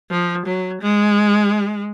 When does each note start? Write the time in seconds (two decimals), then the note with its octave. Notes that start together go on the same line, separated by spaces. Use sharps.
0.10 F3
0.46 F#3
0.81 G#3